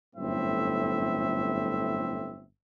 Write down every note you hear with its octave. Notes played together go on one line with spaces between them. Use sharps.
G1 F#2 A2 C4 E5